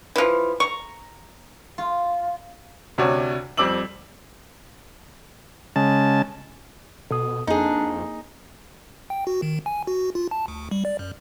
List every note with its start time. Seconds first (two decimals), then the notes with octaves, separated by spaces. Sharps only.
0.16 E3 F3
0.60 A#5 C#6
1.78 F4
2.98 D2 C3 D4 F#4 C#5
3.57 F2 G3 C4 D6 E6 F#7
5.76 C#3 G#3 A5
7.11 B2 A4 D#6
7.47 F2 A#3 D4 D#4 G#4
9.10 G5
9.27 F#4
9.42 D#3
9.66 G#5
9.87 F#4
10.15 F4
10.31 A5
10.48 D2
10.71 G3
10.85 D5
10.99 F#2